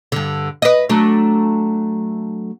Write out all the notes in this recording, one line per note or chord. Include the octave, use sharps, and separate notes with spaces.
G2 D3
B4 D#5
F#3 A3 D4